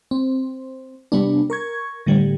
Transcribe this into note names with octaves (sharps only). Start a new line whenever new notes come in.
C4
C3 G3 B3 D4
A#4 C#6 G#6
A2 D3 G3